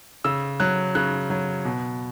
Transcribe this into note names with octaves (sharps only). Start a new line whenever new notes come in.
C#3 E6
F#3 F#6
C#3 F#6
F#3
B2